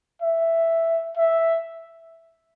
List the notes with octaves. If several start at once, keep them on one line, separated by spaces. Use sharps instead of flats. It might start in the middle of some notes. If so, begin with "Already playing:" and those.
E5
E5